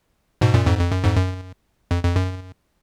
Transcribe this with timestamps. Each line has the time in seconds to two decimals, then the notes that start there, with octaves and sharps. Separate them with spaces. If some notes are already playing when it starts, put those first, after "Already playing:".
0.41 G#2 B2
0.54 F#2 A#2
0.66 F2 G#2
0.79 F2
0.92 F#2
1.04 F2 G#2
1.16 F#2
1.91 F2
2.03 F2
2.16 F#2